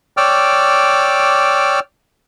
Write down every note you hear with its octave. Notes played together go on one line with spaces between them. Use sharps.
C#5 D5 G5 D6 E6 F6